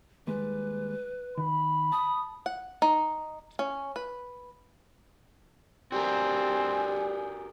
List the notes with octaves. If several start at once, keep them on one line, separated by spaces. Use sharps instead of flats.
D#2 G3 G#3 B4
D#3 B5
A5 D#6
F#5
D#4
C#4
B4
G3 C4 F#4 G4 A#4 G#5